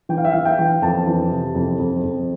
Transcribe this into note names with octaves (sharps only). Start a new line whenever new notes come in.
E3 G5
F5
E5
E3 F5
G5
E3
F2 A5
E3
C3
F2
F2
F2